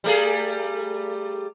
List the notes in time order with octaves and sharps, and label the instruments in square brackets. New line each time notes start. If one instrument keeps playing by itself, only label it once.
[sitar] G3 A3 G#4